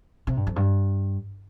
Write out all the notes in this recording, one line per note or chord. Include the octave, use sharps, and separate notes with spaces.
C3
G2
F2
G2